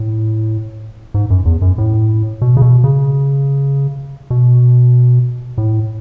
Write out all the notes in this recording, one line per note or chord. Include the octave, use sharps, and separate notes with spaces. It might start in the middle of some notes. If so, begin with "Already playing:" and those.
Already playing: A2
G#2
F#2
E2
F#2
A2
B2
C#3
B2
C#3
B2
A2